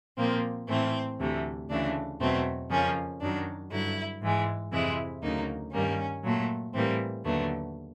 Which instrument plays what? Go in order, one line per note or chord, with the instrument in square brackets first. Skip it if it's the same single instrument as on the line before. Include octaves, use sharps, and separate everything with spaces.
[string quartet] A#2 F3 A#3 C4
A2 E3 A3 C4
D2 C3 E3 A3
D2 C#3 E3 A3 D4
E2 B2 F#3 A3 C4
F2 C#3 F3 A#3 C#4
F#2 D#3 F#3 D4
G2 D3 F#3 E4
G#2 E3 G#3
F2 C3 E3 G#3 E4
D2 C#3 F#3 A#3 D#4
G2 D#3 G3 A#3 C#4
A#2 F#3 A3
A2 E3 G3 A#3 C4
D#2 D3 F#3 A3 B3